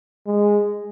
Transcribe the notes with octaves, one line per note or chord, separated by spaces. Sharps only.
G#3